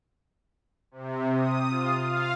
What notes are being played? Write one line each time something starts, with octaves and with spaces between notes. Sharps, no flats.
C3
D#6
F4
F5